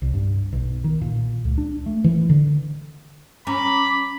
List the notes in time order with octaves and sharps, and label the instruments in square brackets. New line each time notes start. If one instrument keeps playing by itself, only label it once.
[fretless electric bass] C2
G2
B1
D#3
A#2
C#2
D4
A3
E3
D3
[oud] C#4 [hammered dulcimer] A#5 [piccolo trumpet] B5 [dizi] D6